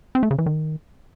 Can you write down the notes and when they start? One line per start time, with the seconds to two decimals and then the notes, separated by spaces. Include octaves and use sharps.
0.15 C4
0.23 A3
0.31 C#3
0.38 E3
0.46 D#3